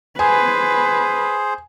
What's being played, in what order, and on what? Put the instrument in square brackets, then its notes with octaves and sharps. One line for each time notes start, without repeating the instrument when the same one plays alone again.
[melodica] G#4 C5 [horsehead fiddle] B4 [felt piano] G#5